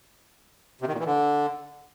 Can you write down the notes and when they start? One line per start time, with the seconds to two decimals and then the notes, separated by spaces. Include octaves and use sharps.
0.81 C3
0.87 D#3
0.94 A#2
1.00 E3
1.06 D3